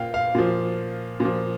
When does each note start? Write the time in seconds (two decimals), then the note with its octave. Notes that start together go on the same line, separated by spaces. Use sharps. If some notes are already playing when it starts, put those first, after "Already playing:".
Already playing: A#2 F5 G5
0.14 F5
0.35 A#2 F3
1.20 A#2
1.25 F3